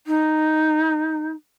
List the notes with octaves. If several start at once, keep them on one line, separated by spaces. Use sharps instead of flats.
D#4